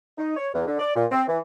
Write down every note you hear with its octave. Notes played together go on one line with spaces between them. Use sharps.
D#4
C#5
E2
D3
D5
A#2
C4
E3